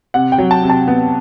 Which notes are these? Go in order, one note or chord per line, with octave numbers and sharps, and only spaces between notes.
C3 F#5
G5
F#3
A5
C3
A5
B3